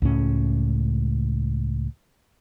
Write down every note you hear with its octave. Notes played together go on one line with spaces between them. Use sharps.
C#2 A2 C#4